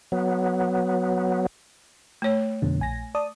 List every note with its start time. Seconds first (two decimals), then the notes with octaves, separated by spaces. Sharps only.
0.12 F#3 B3
2.22 A3 C#5
2.62 F2 B2 D3
2.80 A#1 G#5 A#6
3.15 D5 A5 D#6